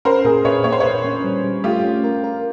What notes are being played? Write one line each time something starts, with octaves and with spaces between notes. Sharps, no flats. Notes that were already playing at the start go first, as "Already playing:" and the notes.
C#4 A#4 C5
A#2 G#4 A#4
A#2 B4 C#5
A#3 C#5
C5
A#2 B4 C#5
C#4
G3
G3
A3 F4 G4
C#4
A#4
A#4